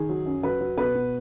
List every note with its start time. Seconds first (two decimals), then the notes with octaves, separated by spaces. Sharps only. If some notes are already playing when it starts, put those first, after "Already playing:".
Already playing: D#3 G#4
0.09 F#3
0.26 F#2
0.43 F#3 B4
0.60 F#3
0.77 B2 B4
0.95 B2